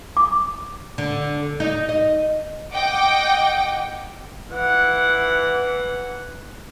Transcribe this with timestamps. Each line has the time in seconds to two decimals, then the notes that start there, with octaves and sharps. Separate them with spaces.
0.17 D6
0.98 D3
1.60 D#4
1.89 D#5
2.72 D#5 F#5 G5 D6
4.51 E3 F#5